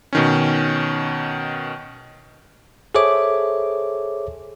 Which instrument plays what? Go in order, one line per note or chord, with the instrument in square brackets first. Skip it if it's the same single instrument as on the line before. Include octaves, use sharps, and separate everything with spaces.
[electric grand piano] B2 D#3 C#4
[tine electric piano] G#4 A4 C5 C#5 E5 D6